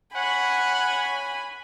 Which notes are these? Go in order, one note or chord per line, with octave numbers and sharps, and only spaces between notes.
C#5 F#5 G#5 B5